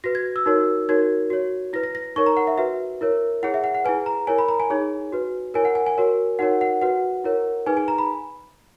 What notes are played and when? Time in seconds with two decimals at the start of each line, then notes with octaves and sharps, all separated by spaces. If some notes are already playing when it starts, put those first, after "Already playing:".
0.04 F#4 B4 A#6
0.15 G#6
0.36 E6
0.46 D#4 F#4 A#4 C#5
0.89 D#4 F#4 A#4 C#5 G#6
1.30 F#4 C#5
1.73 E4 B4 A#6
1.83 A#6
1.95 A#6
2.16 D#4 A#4 C#5 C#6
2.26 A#5
2.37 F#5
2.47 E5
2.58 F#4 B4 E5
3.01 E4 A#4 C#5
3.43 E4 G#4 C#5 F#5
3.54 E5
3.64 F#5
3.74 F#5
3.85 E4 G#4 B4 G#5
4.06 A#5
4.27 E4 A#4 C#5 G#5
4.38 B5
4.48 A#5
4.60 G#5
4.70 D#4 G#4 C#5
5.12 F#4 B4
5.54 E4 A#4 C#5 G#5
5.65 F#5
5.75 G#5
5.86 G#5
5.98 F#4 A#4 C#5
6.39 D#4 F#4 A#4 C#5 F#5
6.61 F#5
6.82 F#4 B4 F#5
7.24 E4 A#4 C#5
7.66 D#4 G#4 B4 G#5
7.77 G#5
7.88 A#5
7.98 B5